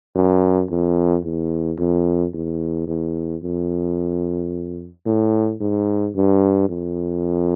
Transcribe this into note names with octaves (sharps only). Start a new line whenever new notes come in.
F#2
F2
E2
F2
E2
E2
F2
A2
G#2
G2
F2